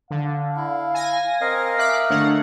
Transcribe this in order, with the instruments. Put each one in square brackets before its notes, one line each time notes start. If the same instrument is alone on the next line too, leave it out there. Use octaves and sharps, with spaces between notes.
[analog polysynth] D3 [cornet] F5
[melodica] E4
[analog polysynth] G#5 A#6
[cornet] C4 [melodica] A#4 D#5 F5
[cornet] E5 [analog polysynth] D6 F#6 B6
[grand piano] D3 [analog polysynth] A3 C#5 F#5